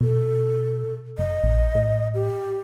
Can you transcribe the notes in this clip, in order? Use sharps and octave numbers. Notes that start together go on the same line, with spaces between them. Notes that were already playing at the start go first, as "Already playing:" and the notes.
B2 A4
F#1 D#5
A#1
A2
G4